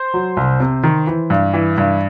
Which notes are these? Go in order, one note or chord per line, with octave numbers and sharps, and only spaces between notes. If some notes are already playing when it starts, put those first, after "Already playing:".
Already playing: C5
F#3
C2
C3
D#3
E3
G2
E3
G2